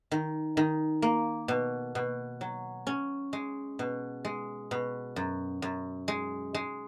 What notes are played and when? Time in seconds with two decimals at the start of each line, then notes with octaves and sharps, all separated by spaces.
0.11 D#3
0.57 D#3
1.02 A#3
1.48 B2
1.95 B2
2.41 F#3
2.87 C#4
3.33 G#3
3.79 B2
4.25 G#3
4.71 B2
5.16 F#2
5.62 F#2
6.08 G#3
6.55 G#3